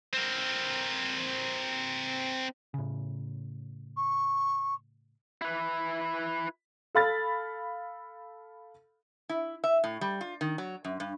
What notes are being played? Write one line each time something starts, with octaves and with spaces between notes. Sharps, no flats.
C4 A#4
A2 C#3
C#6
E4 B4
A4 F5 B5 F6 A6
E4
E5
A2
G3
F4
D#3
F#3
F#2
G2